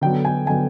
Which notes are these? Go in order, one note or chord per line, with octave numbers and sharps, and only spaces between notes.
D3 F#3 B3 G5
G#5
D3 F#3 B3 G#5